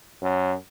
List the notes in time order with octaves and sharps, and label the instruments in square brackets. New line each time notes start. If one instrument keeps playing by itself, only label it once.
[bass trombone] F#2